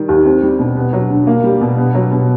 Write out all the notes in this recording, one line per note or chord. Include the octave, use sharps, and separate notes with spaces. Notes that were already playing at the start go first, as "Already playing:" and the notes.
Already playing: D#3 G3
D#2
C4
G3
B2
B3
F#3
D3
A#3
G3
B2
B3
F#3
B2